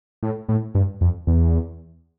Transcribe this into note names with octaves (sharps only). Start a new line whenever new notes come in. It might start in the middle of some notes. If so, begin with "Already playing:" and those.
A2
A2
G2
F2
E2